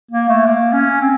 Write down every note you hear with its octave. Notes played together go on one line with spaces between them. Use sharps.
A#3
A3
A#3
C#4
C4